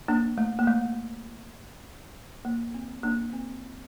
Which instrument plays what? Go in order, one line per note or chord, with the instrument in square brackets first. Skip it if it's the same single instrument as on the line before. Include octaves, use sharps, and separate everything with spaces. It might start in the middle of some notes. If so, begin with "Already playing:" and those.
[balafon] A#3 D4
A3
A#3
A3
A#3
C4
A#3 D4
C4